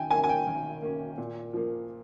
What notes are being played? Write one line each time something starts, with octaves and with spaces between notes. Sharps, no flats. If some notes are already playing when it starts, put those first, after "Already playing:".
Already playing: D#3 G5 G#5
A#3 C#4 G#5
G#5
G5
D#3
A#3 C#4
A#2
F3 A#3